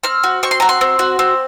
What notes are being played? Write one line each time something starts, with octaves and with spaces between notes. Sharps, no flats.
C4 F6
F#4
C4 C#6
C6
F#4 A#5
C6
C4
F#4
C4